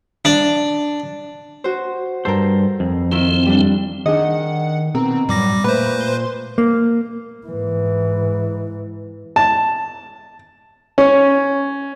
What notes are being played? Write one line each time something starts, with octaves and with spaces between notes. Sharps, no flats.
D4
F#4 C5
G2 A4 A#4 C5
F2
D#3 C4 E4 F4
G3 D4
D#3 D4 G#4 D#5 F#5
B2 C4 A#4
F#2 A2 G3 D6 A#6
A#2 A3 B4 C5 B5
C6
A#3
G#2 E3
A5
C#4